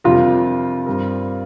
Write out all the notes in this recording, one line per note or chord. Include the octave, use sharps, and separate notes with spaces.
F2 C3 G3 D4 F4 A#4
G2 G3 C4 A#4